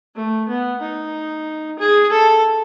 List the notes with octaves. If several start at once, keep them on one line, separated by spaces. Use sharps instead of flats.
A3
B3
D#4
G#4
A4